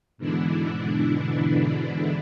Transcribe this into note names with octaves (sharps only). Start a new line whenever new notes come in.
G#2 B2 D3 E3 D4 E4